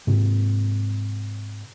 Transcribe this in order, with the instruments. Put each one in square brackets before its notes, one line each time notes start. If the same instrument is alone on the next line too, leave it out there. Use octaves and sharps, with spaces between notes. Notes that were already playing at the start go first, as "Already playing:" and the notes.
[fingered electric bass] G#2 C3